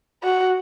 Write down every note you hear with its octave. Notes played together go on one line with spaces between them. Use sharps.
F#4